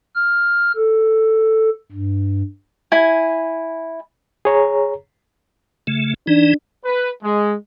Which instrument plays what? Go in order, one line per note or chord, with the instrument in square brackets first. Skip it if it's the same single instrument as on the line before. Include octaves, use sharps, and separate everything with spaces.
[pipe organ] F6
A4
G2
[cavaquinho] E4 G#5
[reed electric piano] G#4 C#5 A#5
[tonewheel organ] C#3 A3
[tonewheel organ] E3 D#4 [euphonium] D4
[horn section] B4
G#3